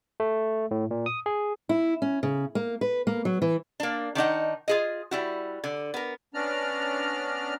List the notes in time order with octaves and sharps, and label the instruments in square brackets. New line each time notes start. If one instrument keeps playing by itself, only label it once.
[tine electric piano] A3
A2
A#2
D#6
G#4
[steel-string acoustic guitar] E4
C#4
C#3
A#3
B4
A#3
F#3
E3
[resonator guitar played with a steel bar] A#3 D4
D#3 D4 D#4 F#5
F4 G#4 D#5
G3 E4 F#4
D3
B3 A#4
[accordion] B3 C#4 D4 D5 A#5 F6